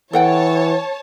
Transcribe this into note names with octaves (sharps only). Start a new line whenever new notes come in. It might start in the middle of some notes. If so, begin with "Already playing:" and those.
E3 A4 C#5 F#5 G5 A5